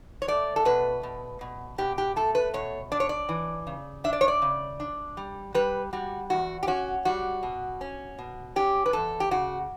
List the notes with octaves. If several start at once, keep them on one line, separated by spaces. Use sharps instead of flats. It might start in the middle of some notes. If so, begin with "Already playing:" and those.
C#5
A3 D5
A4
B2 B4
B2
B2
B2 G4
G4
A3 A4
B4
B2 C#5
D4 D5
C#5
D5
E3
C#3
D4 E5
D5
C#5
D5
C#3
D4
G3
G3 B4
G3 F#4
E2 F#4
G4
C#4 F#4
G3 F#4
B2
C#4
B2
C#4 G4
B4
E2 A4
G4
C#3 F#4